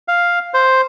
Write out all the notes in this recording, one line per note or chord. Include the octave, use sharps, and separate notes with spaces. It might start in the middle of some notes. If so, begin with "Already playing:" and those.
F5
C5